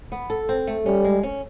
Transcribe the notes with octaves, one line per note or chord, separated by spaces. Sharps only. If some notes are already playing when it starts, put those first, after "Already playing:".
B3
A4
C4
A3
G3 C#4
G#3
C#4